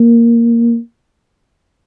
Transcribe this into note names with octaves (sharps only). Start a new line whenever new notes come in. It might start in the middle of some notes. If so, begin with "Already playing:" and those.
Already playing: A#3